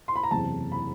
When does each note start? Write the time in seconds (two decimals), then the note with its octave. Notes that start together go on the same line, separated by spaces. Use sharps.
0.08 C6
0.16 B5
0.23 A#5
0.31 F#1 E2 C3 A5
0.72 B5